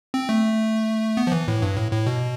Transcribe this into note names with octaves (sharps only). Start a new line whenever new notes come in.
C4
A3
B3
F3
E3
A2
G2
A2
A2
B2